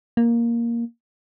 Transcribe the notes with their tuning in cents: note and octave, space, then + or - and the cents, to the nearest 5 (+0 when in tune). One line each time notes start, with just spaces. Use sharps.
A#3 +5